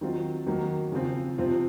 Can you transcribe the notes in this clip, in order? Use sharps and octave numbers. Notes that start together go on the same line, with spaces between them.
D#3 F#3 C4 F4
D#3 F#3 A#3
C#3 F3 C4 F4
C3 F3 C4 F4